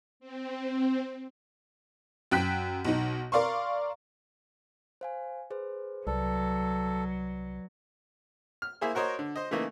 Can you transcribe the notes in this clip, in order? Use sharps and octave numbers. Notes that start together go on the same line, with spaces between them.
C4
F#2 G5 F#6 B6
B1 D#4
A#4 D5 F5 C6 C#6
C5 F5 G#5
G#4 B4 C5
C2 F#3 A4 B4 D5
F6
A#3 E4 G#4 C5
F#4 A#4 C5 C#5 D#5
D3
C5 D#5
C#3 E3 A3 A#3 D#4